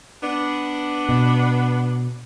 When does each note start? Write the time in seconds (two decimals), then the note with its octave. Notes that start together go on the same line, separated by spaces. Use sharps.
0.22 B3 D4
1.09 B2